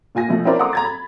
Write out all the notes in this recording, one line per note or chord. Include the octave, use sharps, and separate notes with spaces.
A#2 F4 G#5 A#6
B2 F3 A3
C4 C#4 E4 A#4 C5 D5
F#5 A#5 C6 D6 D#6
A#5 G#6 A6
B5